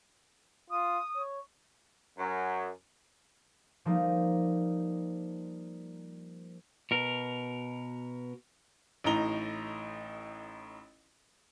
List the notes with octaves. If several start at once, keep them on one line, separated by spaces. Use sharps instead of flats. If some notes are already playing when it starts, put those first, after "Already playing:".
F4 D#6
C#5
F#2
F3 G3 A#3 D#4
B2 A#4
A1 A2 D#4 A#5 G7